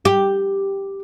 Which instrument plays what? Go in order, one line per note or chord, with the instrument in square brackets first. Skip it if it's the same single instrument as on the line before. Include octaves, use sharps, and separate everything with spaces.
[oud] G4